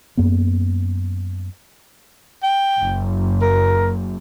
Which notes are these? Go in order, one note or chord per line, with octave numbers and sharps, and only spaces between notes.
F#2 A#3 B3
G5
F#1 F#2
A#4